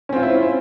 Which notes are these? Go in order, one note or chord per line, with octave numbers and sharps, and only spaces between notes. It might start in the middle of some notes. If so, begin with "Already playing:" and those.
C4 C#4 E4 F4 C5